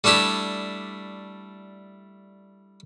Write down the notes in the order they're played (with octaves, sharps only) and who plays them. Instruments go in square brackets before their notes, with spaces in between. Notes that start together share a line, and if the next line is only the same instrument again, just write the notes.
[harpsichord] G3 A3 D4 E4 G4